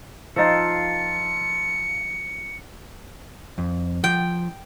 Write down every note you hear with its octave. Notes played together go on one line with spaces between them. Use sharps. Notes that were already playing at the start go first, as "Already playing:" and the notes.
F3 D#4 F4 A4 C#7
F2
F3 G5